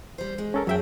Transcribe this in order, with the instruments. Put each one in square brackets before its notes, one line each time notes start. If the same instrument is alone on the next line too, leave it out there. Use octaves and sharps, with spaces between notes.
[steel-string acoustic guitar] G3 C5
G#3
[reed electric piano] C#4 A4 A#4
[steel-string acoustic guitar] F#2 G#4 [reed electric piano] F#3 E5 G5